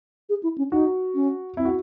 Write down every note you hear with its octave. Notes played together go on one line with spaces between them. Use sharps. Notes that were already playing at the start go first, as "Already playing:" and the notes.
G#4
E4
C#4
D#4 F#4
C#4
C4 E4
F#4